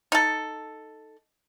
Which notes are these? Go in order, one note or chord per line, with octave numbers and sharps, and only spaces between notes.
D#4 A4